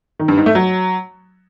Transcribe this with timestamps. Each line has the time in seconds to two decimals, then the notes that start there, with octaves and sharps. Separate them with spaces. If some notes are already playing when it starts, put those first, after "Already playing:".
0.19 D#3
0.28 G2
0.37 G#2
0.46 A3
0.55 F#3